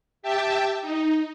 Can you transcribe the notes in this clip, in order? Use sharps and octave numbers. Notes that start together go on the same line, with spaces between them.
G4 E5 G5 A5
D#4